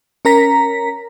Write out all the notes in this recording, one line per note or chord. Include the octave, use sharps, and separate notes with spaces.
C#4 A#4 A#5 B6